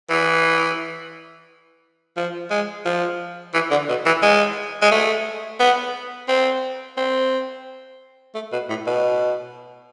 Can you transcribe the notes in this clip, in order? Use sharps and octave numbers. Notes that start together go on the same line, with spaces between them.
E3
F3
G#3
F3
E3
D3
B2
E3
G#3
G#3
A3
B3
C4
C4
A3
B2
A2
B2